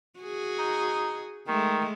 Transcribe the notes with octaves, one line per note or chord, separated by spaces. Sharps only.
F#4 G#4
D#4
D#3 G#3 A3